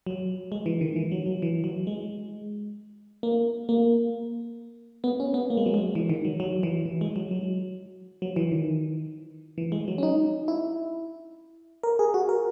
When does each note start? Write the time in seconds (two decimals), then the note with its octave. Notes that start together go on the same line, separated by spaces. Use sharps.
0.06 F#3
0.52 G#3
0.66 E3
0.81 D#3
0.96 E3
1.12 F#3
1.26 F#3
1.42 E3
1.64 F#3
1.87 G#3
3.23 A#3
3.69 A#3
5.04 B3
5.20 C#4
5.34 B3
5.50 A#3
5.57 G#3
5.66 F#3
5.74 G#3
5.95 E3
6.09 D#3
6.25 F#3
6.40 F#3
6.63 E3
6.85 E3
7.01 G#3
7.16 F#3
7.31 F#3
8.22 F#3
8.36 E3
8.51 D#3
9.58 E3
9.72 G#3
9.88 F#3
9.98 C#4
10.03 D#4
10.48 E4
11.83 A#4
11.99 G#4
12.14 F#4
12.29 A#4